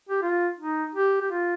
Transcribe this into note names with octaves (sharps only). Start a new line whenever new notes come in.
G4
F4
D#4
G4
G4
F4